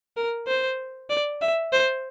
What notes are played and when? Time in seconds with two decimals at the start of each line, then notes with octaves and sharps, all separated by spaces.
0.17 A#4
0.48 C5
1.10 D5
1.42 E5
1.73 C5